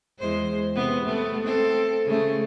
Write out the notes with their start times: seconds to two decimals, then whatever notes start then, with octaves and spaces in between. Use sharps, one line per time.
0.19 E2 G#3 C5
0.76 C3 B3
1.05 A3 B3
1.43 C4 A4
2.05 C#3 A3